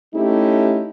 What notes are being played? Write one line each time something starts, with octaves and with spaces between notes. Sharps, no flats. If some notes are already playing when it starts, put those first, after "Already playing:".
A3 C#4 D#4 E4 G4